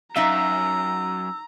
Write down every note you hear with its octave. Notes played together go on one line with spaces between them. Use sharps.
F#2 D#4 E5 F5 A#5 E6